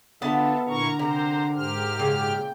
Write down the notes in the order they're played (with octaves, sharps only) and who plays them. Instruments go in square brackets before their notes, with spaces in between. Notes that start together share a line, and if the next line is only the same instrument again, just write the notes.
[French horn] D3 [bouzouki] B3 B4 A5 [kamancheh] F4 E5 [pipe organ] A4
[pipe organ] A#2 E4 C#6 [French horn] D3 [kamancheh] A#4 A#5
[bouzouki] C3 [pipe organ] C5
[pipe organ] G#2 G4 F6 [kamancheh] A#4 C5
[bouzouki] A#2 C#3 [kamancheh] G5